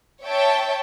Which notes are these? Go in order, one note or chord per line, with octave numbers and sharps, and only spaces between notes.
C#5 E5 G5 A5